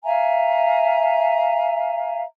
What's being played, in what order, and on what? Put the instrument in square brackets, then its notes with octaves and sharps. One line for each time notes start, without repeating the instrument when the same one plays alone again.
[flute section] E5 F5 G#5 A#5